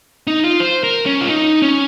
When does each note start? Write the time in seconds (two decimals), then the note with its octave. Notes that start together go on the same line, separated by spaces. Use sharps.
0.27 D#4
0.44 F4
0.60 C5
0.84 A#4
1.06 C#4
1.21 F4
1.29 D#4
1.62 C#4